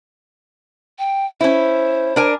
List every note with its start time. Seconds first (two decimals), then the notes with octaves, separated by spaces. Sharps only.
0.99 G5
1.41 C#4 E4 C5
2.16 D4 A#4 G#5